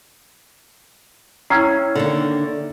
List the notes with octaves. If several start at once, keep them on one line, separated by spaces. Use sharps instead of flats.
C#4 E4 G5 A#5 E6 C7
D3 D#3 A#3